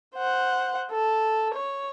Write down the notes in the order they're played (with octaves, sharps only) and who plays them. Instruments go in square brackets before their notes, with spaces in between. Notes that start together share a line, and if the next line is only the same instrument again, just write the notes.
[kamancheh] C5 F#5
A4
C#5